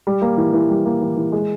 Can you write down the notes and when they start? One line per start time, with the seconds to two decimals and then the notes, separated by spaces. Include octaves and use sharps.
0.07 G3
0.22 A#3
0.37 E3
0.53 E3
0.70 G3
0.86 A#3
1.02 E3
1.17 E3
1.32 G#3